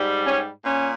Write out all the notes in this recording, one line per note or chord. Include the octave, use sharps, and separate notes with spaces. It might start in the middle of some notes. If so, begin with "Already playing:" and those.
Already playing: G#2 G3
C#4
A#2 C#4